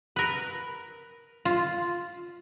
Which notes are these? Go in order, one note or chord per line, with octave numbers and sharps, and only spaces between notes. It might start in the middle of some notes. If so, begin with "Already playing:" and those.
A#4 B4
F4